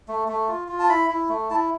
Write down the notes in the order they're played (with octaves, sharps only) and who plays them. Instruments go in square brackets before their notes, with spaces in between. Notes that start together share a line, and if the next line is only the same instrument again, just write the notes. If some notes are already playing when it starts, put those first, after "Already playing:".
[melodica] A3
A3
F4
F4
A5
E4 B5
E4
A3
E4 A5